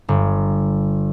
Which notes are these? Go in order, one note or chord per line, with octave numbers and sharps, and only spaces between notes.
G1